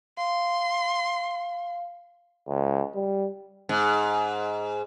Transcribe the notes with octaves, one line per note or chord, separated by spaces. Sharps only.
F5 C6
C#2
G3
G#2